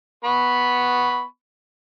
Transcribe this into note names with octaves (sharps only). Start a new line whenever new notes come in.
B3 B5 C#6